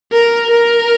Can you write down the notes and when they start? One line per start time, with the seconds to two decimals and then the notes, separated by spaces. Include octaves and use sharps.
0.13 A#4
0.50 A#4